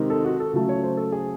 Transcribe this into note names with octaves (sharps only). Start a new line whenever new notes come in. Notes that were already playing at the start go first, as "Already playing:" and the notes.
Already playing: C3 D#3 G#3 D#4
A4
F#4
A4
C#3 F#3 A3
C#5
C5
A4
G#4